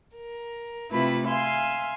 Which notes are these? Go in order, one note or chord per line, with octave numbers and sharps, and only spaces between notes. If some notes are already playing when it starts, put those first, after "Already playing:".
A#4
C3 A3 E4 F4 B4 B5
E5 F5 G#5 C6